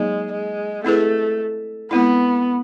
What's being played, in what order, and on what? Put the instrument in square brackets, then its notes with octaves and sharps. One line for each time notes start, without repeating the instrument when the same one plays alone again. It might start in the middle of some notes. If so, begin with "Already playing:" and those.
Already playing: [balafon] F#3 A#3 D#4 [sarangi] G#3
[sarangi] G#3
[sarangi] A3 [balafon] C4 E4 G#4 B4
[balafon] G#3 C4 E4 [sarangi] B3